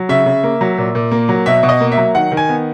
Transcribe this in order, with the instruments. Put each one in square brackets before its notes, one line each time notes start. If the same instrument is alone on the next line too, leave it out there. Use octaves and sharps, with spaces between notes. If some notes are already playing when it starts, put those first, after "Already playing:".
Already playing: [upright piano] F#3
C#3 E5
C#3
A#3
F#3
A#2
A#2
A#3
F#3
B2 E5
B2
D#5
A#3
E5
F#3
D#3 F#5
D#3
G#5
B3